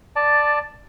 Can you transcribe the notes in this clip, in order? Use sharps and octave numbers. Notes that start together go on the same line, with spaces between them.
D5 A5